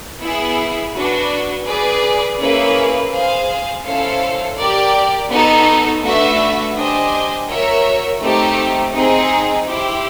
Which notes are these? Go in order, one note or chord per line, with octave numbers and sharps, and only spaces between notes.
B3 E4 G#4
D4 F#4 B4
G#4 B4 D5
A#3 C#4 E4 G#4 B4
G#4 C5 F5 G#5
C#4 E4 A4 C5 F5
G4 A#4 D5
B3 D#4 F#4 A4
A3 D4 F#4 B4 E5
D4 G4 C5 D#5 G#5
F#4 A#4 C#5 E5
A3 C4 D#4 G4
C4 D#4 G#4
E4 G4 C5